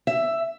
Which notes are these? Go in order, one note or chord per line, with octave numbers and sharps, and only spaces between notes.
E5